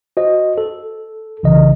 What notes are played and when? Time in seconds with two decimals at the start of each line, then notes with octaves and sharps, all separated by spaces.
0.17 F#4 C5 D#5
0.58 A4
1.43 B1 C#3 E3 D#5